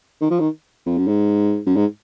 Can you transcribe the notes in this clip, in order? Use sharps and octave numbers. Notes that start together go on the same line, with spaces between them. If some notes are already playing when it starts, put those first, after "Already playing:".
D#3
F3
D#3
F2
F#2
G#2
F#2
G#2